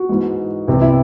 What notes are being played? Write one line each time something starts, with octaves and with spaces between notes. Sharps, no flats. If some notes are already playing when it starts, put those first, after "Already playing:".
Already playing: F#4
G#2 E3 G#3
C2 C3 E3 G3 B3
E4